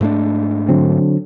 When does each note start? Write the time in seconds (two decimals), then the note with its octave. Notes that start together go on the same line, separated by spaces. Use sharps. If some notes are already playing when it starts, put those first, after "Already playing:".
0.01 G#2 A3 D4
0.68 D3 F#3 C4